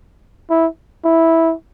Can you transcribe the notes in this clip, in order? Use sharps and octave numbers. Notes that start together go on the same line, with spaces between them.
E4
E4